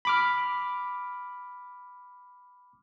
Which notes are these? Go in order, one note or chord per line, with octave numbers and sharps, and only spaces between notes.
B5 D6 F6